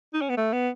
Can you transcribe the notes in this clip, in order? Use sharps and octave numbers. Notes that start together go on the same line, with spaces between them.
D#4
C#4
B3
A3
B3